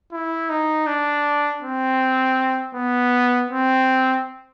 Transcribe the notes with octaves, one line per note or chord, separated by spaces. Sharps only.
E4
D#4
D4
C4
B3
C4